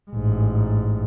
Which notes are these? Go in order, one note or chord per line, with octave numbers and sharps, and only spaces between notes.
A1 G#2